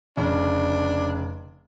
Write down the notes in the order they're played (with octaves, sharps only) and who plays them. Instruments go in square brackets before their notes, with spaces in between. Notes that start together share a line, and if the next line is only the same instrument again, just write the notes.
[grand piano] F1 C#3 [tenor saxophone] D4